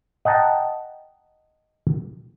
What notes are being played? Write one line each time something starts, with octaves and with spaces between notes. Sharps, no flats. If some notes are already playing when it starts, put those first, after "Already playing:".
D#5 F#5 G5 A5 A#5